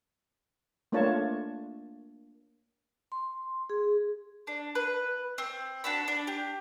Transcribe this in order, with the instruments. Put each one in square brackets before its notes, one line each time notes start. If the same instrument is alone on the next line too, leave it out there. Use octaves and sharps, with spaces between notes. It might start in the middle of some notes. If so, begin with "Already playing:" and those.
[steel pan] A3 A#3 D4 F4 C#5 A5
[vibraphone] C6
G#4
[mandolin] D4
B4
C4
D4 F#4 A5 B5
D4
G4